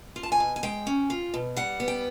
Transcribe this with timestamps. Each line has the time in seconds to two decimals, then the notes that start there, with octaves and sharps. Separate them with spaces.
0.16 F4
0.23 A5
0.32 G#5
0.40 B2
0.56 G#5
0.63 G#3 G5
0.87 C#4
1.10 F4
1.34 B2
1.56 G3 F#5
1.80 B3
1.88 G5